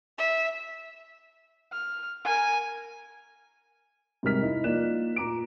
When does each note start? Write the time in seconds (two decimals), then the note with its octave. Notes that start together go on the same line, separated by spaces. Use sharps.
0.18 E5
1.72 F6
2.24 A#4 G#5
4.23 G#2 C3 G3 A#4 F6 B6
4.41 D#4 E4
4.64 F3 A#3 D#4 D5 F#6 E7
5.16 A#2 A#5 D6 D7